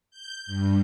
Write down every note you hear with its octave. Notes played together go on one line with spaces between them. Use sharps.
G6
G2